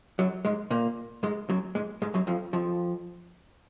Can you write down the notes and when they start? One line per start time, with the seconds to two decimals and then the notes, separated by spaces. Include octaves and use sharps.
0.19 F#2 F#3
0.45 G#2 G#3
0.71 A#2 A#3
1.23 G#2 G#3
1.50 F#2 F#3
1.75 G#2 G#3
2.02 G#2 G#3
2.14 F#2 F#3
2.27 F2 F3
2.53 F2 F3